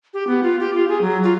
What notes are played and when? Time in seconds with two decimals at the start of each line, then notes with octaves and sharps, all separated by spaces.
0.14 G4
0.27 B3
0.43 F4
0.60 G4
0.74 F4
0.88 G#4
1.01 F#3
1.23 F4